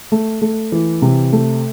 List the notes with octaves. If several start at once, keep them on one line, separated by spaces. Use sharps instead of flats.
A3
A3
E3
C3
A3